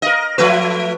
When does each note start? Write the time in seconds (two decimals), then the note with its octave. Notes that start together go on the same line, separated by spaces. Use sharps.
0.02 A#4 D#5
0.38 F3 A3 B4